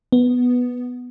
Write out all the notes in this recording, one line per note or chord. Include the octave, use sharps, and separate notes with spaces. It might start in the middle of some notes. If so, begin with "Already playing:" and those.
B3